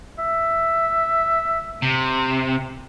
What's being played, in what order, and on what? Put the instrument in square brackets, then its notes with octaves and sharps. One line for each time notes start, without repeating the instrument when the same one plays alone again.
[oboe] E5
[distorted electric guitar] C3